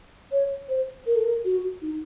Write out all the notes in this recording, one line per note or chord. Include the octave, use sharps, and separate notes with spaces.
C#5
C5
A#4
A4
A#4
F#4
D#4